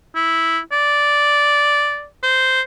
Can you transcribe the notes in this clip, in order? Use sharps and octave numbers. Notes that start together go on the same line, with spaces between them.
E4
D5
C5